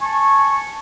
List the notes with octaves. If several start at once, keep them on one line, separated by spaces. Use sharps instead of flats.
G#5 A5 C#6